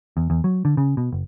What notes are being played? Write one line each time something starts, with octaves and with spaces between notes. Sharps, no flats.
E2
E2
F#3
D3
C#3
B2
F#1